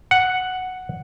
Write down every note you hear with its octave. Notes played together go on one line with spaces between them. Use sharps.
F#5